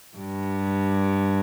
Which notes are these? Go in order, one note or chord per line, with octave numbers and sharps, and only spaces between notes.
G2